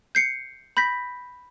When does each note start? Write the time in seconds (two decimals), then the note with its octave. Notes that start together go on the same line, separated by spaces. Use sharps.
0.15 G6 C7 C#7
0.77 B5 G6 A#6 B6